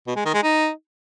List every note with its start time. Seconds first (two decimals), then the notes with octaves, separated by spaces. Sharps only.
0.07 B2
0.16 G#3
0.25 D#3
0.34 G#3
0.43 D#4